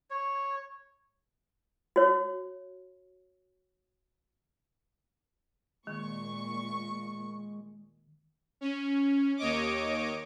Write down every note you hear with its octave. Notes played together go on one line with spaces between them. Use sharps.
C#5
F#4 C#5
A#2 D#3 G#3 C#6
C#4
D#2 C#5 D#5 D6